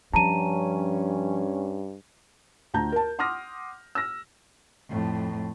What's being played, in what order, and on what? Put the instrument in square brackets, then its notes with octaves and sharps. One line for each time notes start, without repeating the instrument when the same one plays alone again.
[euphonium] G2 [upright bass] F3 [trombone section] C#4 [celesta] A5 A#5 D#7
[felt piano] D2 A5 A#5 G6
A#4 A5
F#5 C6 D6 D#6 F6 A#6
E6 F6 A#6
[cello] F2 A2